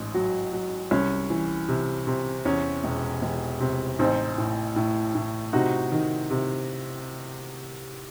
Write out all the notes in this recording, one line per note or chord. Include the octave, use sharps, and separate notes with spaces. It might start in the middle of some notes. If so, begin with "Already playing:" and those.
Already playing: A1 G#2
F#3
F#3
C2 C#4
E3
C3
C3
E2 C#4
E1
E1
C3
A1 C4 D#4
A2
A2
A2
C3 D#4 F#4
D#3
C3